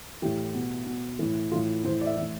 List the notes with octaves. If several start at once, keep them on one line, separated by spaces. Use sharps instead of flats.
A2 E3 G4
B2
B2
A2 E3
A2 E3 F4
A2 E3 C5
D5
E5
E3 E5
A2